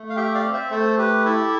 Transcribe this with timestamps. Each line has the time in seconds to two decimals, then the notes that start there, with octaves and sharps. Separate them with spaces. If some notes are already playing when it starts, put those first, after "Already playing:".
Already playing: A3
0.10 F5
0.16 G4 E5 G5
0.34 D5 F5
0.44 C4
0.53 C5 E5
0.71 A3 A4 C5
0.98 G4 B4
1.25 E4 A4